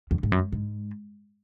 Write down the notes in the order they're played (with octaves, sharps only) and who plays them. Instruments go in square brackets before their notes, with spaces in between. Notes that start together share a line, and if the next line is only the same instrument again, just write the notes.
[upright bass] E2
G#2
F#2
G#2